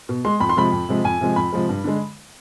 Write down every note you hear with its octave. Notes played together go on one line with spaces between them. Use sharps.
B2
G#3 C6
F2 B5
C6
C3 F3 G#3 B5
F2
C3 F3 G#3
F2 G#5
C3 F3 G#3
F2 B5
C3 F3 G#3
G2
D3 G#3